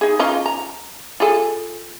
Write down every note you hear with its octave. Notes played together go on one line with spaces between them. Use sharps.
D#4 G#4
C#4 D#4 F4
A#5
F4 G#4 A4